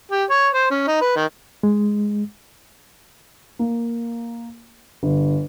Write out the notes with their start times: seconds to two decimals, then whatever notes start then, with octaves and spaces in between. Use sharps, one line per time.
0.11 G4
0.30 C#5
0.54 C5
0.70 C#4
0.87 D#4
1.01 B4
1.16 D#3
1.63 G#3
3.59 A#3
5.03 G1